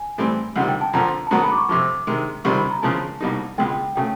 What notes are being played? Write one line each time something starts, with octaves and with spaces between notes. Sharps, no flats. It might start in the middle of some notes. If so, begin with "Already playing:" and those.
Already playing: G#5
A2 E3 G3 C4
C#2 C3 D#3 G3 F#5
G5
A5
F2 D3 F3 A#5
A5
G#2 D#3 F#3 B3 A#5
B5
D6
C#6
F2 C3 F3 D6
C3 D#3 G#3
C#2 C3 D#3 G3 C4 C#6
B5
A#5
E2 C#3 F3 G#3 A5
C2 B2 G3 A#3 D#4
C#2 B2 G#3 G5
C#3 F#3 A3 G5